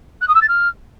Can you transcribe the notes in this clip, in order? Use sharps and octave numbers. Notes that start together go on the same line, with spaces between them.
F#6
D#6
E6
A6
F6